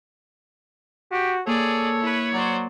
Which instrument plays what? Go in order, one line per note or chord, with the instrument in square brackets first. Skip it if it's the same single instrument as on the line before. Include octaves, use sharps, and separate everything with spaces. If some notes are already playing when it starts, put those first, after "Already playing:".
[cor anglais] F#4 [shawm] G4
[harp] A#3 [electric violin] G#4 D5 [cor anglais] A4 [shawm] C#5
[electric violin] E4 B4
[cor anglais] F#3 [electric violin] C5 D5